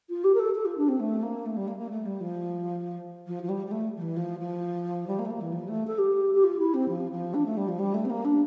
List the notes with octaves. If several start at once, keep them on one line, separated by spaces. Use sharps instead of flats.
F4
G4
A#4
A4
A4
F4
D4
C4
A3
A#3
A3
G3
A#3
A#3
A3
G3
F3
F3
F3
G3
G3
A3
F3
E3
F3
F3
G3
A#3
A3
A#3
E3
F3
A3
A4
G4
G4
F4
E4
C4
F3
F3
D4
A3
G3
F3
G3
A3
C4
A#3
D4